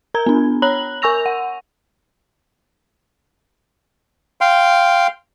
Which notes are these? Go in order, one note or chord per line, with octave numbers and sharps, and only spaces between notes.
A#4 A#5 G#6
B3 D4
C#5 A#5 B5 F#6 F#7
A#4 G#5 C#6 E6 A#6 F7
F#5
F5 G5 C6